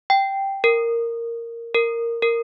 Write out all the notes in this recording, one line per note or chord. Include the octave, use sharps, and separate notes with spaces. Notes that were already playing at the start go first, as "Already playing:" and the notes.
G5
A#4
A#4
A#4